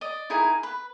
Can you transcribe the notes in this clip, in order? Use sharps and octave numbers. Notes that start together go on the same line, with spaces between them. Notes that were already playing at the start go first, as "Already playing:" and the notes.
D5 D#5
D#4 E4 G#4 A#4
B4